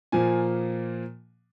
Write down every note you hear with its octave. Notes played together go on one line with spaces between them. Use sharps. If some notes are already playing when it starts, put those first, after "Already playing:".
A#2 F3 A#3 G#5